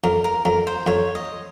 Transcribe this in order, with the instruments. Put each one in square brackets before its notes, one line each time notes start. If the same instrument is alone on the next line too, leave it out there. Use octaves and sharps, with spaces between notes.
[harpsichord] F2 [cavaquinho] A#4
[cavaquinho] A#4
[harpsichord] F2 [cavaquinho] A#4
[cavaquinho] C5
[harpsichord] F2 [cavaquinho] C#5
[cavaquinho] D#5